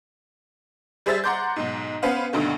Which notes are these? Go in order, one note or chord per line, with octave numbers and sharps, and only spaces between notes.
G3 G#4 C5 E5 A6
F#5 A#5 C6 D6 G6
B1 G#2
B3 C#4 B4 C5 F5 F#5
D2 G2 B2 D3 D#3